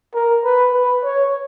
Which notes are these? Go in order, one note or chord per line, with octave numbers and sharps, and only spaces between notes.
A#4
B4
B4
C#5